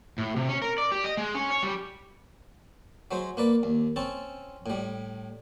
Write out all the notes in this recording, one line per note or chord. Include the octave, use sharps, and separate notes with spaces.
A2
C3
C#4
A#4
D5
G4
D#5
G#3
C#4
C#5
G3
F#3 G#3 C5
A#3 B4 D5
D#2
C4 C#4 A5
A2 G3